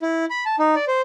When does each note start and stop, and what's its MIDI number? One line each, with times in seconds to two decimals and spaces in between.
0.02 0.25 64
0.30 0.44 83
0.46 0.56 81
0.59 0.75 63
0.76 0.85 74
0.88 1.02 72